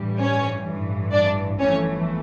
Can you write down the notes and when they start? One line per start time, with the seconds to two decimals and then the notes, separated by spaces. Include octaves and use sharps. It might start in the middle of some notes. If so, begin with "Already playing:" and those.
Already playing: A1 G2 E3 G3
0.19 C#4 C#5
0.65 A1 G2 E3
1.12 D4 D5
1.59 G1 F2 E3 A3 C#4 C#5